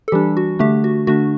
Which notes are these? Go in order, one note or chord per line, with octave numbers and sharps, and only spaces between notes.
A4
E3 G3 D4 G4
F#4
D3 A3 D4 G4
F#4
D3 A3 D4 F#4